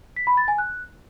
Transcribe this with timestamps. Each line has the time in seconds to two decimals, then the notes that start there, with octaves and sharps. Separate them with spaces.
0.16 B6
0.27 B5
0.37 A6
0.48 G#5
0.58 F#6